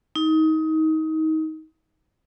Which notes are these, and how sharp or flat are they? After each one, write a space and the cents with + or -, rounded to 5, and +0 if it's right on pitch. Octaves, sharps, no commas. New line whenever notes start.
D#4 +25